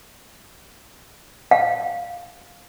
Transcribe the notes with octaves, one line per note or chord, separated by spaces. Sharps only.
F5